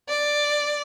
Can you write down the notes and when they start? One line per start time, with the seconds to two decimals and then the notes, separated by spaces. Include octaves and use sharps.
0.08 D5